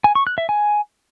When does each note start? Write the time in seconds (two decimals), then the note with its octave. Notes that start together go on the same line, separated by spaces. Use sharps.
0.04 G#5
0.15 C#6
0.27 F#6
0.38 E5
0.49 G#5